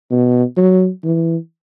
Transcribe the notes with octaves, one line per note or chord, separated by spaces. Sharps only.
B2
F#3
E3